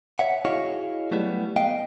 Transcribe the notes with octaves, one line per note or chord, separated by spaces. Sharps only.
C#5 E5 F#5
E4 F#4 G#4 C#5 D#5 F5
F#3 G3 A3 B3 E4
B3 D#5 F5 G5